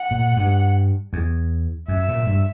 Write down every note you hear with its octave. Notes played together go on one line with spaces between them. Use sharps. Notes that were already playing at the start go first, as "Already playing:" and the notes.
Already playing: F#5
A#2
G2
E2
F#2 E5
A#2
G2